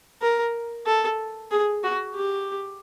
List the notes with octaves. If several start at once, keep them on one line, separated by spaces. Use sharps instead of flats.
A#4
A4
G#4
F#4
G4